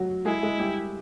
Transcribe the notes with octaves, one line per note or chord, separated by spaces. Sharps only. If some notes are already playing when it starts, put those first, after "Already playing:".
Already playing: F#3 F#4
G#3 E4 G#4
G#3 G#4
G3 G4